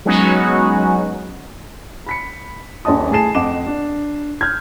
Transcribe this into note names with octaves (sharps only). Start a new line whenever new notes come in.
F#3 G#3 B3 C#4 D#4 F#4
B5 B6 C#7
D#1 A#1 D#5 A5 D#6
A2 G#4 G#5 A5 C7 E7
F2 D#5 F#5 D6 E7
D4
F6 G6 G#6